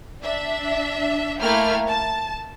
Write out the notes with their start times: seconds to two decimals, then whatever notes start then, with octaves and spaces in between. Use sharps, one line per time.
0.21 D4 E5
1.40 A3 A#3 E4 G5 F6 G#6
1.87 A5